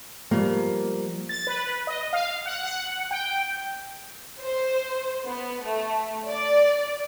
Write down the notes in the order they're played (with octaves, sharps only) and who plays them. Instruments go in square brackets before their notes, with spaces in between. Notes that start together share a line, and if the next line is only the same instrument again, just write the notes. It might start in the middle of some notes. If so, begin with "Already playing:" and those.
[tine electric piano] F3 G3 [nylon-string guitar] A#3
[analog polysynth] A6
B4
D#5
F5
F#5
F#5
G5
[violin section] C5
B3
A3
D5